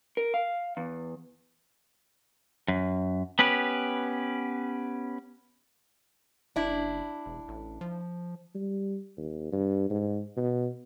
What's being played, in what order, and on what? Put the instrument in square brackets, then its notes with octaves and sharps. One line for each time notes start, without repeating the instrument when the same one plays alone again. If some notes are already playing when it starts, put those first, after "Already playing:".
[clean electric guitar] A#4
F5
E2
F#2
B3 C#4 G4 B4
[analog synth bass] F#1 [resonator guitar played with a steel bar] D4 E4
[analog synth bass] E1
A1
F3
[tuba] G3
D#2
G2
G#2
B2